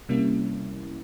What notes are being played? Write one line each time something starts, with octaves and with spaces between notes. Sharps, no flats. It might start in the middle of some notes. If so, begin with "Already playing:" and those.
C3 G3 A#3 C#4 E4